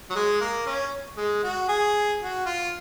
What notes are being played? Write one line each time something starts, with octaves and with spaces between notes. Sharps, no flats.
F#3
G#3
A#3
C#4
G#3
F#4
G#4
F#4
F4